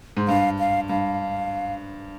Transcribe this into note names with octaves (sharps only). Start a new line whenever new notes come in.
G#2
G2 F5
F5
G2 F5